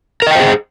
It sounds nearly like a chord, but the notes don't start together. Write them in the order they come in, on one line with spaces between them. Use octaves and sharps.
A#4 D#5 G5 C5 G#4